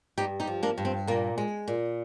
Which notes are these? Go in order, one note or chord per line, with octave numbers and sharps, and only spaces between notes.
G2 D#4 G4
D#4 G4
F3
A#3 D4
G2
C4
A#2 A#3
G#3
A#2